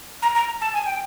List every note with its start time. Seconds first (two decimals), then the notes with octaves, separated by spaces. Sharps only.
0.22 A#5
0.35 A#5
0.61 A5
0.74 G#5
0.86 G5